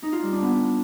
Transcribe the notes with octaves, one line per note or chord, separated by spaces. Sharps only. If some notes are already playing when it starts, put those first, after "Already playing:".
D#4
F4
G3
D4
B3